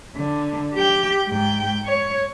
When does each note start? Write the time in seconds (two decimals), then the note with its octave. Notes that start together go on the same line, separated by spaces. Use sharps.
0.16 D3
0.74 G4 G5
1.29 G#2 G5
1.85 C#5